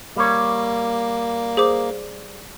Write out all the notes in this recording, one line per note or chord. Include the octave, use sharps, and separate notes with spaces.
G3 A#3 C#5
G#4 C5 D6